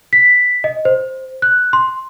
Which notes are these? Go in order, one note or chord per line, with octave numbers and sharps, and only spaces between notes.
B6
D#5
C5
F#6
C6